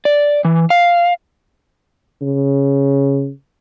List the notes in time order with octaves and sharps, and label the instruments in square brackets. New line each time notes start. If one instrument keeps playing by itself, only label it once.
[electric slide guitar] D5
E3
F5
[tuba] C#3